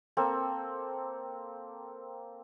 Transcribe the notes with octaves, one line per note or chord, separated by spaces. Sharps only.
A#3 C4 A4